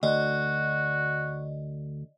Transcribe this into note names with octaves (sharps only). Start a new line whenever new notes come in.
D2 F#4 D5 D#5